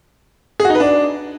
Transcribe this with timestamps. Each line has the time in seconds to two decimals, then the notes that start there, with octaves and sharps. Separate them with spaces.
0.60 G#4
0.65 F#4
0.70 D#4
0.75 B4
0.80 D4